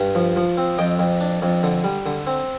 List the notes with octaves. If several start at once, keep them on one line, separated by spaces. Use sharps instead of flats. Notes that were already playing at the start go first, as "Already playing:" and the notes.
Already playing: G2
F3
F3
C4
F2 D#5 G5
F2
D4
F2
D3
G3
D3
C4